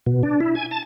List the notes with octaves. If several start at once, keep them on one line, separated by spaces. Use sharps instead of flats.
B2
D4
E4
G#5
A5